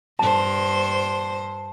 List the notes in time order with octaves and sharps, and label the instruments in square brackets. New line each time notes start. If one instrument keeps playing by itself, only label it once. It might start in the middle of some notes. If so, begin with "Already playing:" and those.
[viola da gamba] G2 C5 [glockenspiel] A5